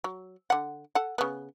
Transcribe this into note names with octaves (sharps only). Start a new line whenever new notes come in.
F#3
D3 F#5
A4 F#5
C#3 B3